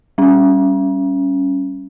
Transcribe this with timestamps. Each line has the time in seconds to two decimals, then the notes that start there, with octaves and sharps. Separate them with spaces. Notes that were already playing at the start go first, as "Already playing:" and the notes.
0.18 G3 C#4